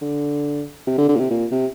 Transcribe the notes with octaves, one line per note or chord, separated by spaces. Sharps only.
D3
C3
D3
D3
A#2
C3
A#2
C3